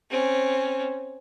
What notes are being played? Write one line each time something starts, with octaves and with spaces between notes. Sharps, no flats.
C4 C#4